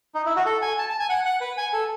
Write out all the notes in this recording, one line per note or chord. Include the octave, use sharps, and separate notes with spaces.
D#4
E4
F#4
A4
G#5
A5
A5
G#5
F#5
F#5
B4
G#5
A4